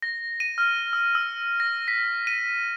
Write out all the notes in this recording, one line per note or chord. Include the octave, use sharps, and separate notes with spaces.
A#6
D#7
F6
E6
E6
A#6
B6
D#7